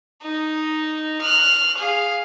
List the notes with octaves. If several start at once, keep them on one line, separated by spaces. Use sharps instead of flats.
D#4
F6 F#6
G#4 F5